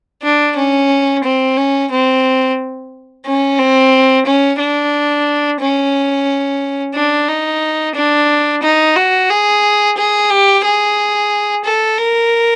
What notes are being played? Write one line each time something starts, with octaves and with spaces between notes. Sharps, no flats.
D4
C#4
C4
C#4
C4
C#4
C4
C#4
D4
C#4
D4
D#4
D4
D#4
F#4
G#4
G#4
G4
G#4
A4
A#4